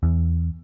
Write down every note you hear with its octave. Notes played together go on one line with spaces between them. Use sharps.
E2